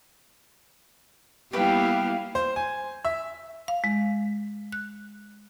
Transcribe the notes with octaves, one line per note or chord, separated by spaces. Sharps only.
G3 A#3 B3 E4 G4 B4 F5 G5
C5
G#5
E5
F5
G#3
F#6